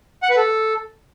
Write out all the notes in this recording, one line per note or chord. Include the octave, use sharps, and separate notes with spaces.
F#5
B4
A4